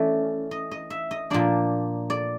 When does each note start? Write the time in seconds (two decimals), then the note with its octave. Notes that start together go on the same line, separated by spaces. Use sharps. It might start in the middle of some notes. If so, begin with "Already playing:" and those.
Already playing: E3 A3 C#4 D5
0.51 D#5
0.71 D#5
0.90 E5
1.11 D#5
1.30 A#2 F3 A#3 D4 D5
2.10 D5